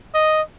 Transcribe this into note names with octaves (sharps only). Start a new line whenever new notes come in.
D#5